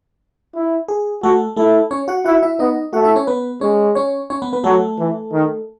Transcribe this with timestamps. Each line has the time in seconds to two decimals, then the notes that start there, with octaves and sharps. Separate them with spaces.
0.55 E4
0.88 G#4
1.22 A3 F#4 A4
1.56 A3 E4 A4
1.91 C#4 C#5
2.08 F#4 F#5
2.25 E4 F#4 F#5
2.43 E4 E5
2.59 B3 D#4 D#5
2.93 A3 F#4 F#5
3.05 E4 E5
3.16 C#4 C#5
3.27 B3 B4
3.61 G#3 C#4 C#5
3.95 C#4 C#5
4.30 C#4 C#5
4.42 B3 B4
4.53 B3 B4
4.64 F#3 A3 A4
4.98 E3
5.32 D#3